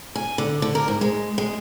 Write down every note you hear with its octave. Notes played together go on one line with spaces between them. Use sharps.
G#5
D3
D3
A#4
G#2
G#3
G#3